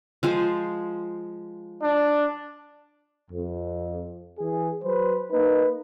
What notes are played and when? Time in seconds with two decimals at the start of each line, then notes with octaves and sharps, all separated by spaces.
0.23 F3 G#3 C5
1.82 D4
3.30 F2
4.38 E3 G#4
4.83 F#3 B4 C5
5.32 A#3 D#4 B4